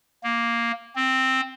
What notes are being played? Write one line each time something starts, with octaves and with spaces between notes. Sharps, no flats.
A#3
C4